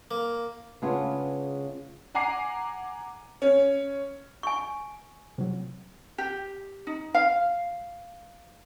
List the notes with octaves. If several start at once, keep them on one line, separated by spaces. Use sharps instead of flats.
A#3
C#3 G#3 B3 D4 F4 G#4
F#5 G#5 A#5 D6 C7
C#4
G#5 C#6
C3 F#3
G4
D#4
F5